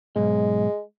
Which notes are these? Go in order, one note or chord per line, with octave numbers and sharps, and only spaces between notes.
B1 G#2 G#3